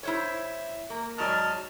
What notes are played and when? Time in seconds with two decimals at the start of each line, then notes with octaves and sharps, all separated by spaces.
0.03 E4 C5 C#5 E5
0.90 A#3
1.18 G#2 F#3 D5 D#5 A5 F6